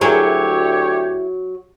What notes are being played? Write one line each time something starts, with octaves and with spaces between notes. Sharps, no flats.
D2 F#3 E4 G4 G#4 A#4 C#5